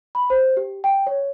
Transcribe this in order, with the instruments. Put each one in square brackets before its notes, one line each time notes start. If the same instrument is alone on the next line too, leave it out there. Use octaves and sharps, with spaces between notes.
[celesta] B5
C5
G4
G5
C#5